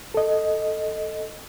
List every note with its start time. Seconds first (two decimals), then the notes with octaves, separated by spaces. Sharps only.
0.14 A4 D#5